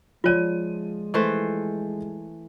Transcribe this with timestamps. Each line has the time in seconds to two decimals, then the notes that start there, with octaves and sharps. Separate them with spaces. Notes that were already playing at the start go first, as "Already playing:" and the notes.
0.24 F3 G#3 F4 C#5 D5 D#7
1.14 E3 A3 C5